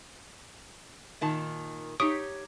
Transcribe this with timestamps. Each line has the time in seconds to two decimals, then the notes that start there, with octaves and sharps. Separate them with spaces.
1.21 A#2 D#3 A5
2.00 D#4 G4 C#5 C#6 D#6 D7